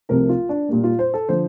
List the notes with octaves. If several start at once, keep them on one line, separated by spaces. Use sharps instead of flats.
C2 C3 F3 A3 A#4
F4
D4
A#2 G3 A#3
F4
C5
A4
D3 F3 C5